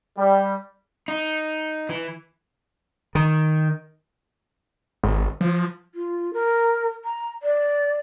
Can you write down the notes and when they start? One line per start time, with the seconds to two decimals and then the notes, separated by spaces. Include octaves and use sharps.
0.18 G3
1.08 D#4
1.89 E3
3.15 D#3
5.03 G#1
5.41 F3
5.95 F4
6.34 A#4
7.05 A#5
7.43 D5